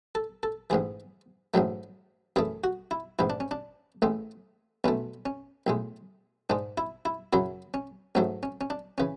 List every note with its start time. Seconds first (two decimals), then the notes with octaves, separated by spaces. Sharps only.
0.15 A4
0.43 A4
0.70 A1 G#2 E3 G#4
1.54 A1 G#2 F#3 A3
2.36 F#2 E3 A3 G#4
2.64 F#4
2.91 E4
3.19 A1 G#2 E3 E4
3.30 D4
3.40 C#4
3.51 D4
4.02 A1 A2 G#3
4.84 B1 B2 A3 C#4
5.26 C#4
5.67 B1 A2 G#3
6.50 G#2 G#3 D4
6.78 E4
7.05 E4
7.33 F#2 C#3 F#3 E4
7.74 C#4
8.15 A1 G#2 F#3 A3 C#4
8.43 C#4
8.61 C#4
8.70 D4
8.98 C#3 E3 C#4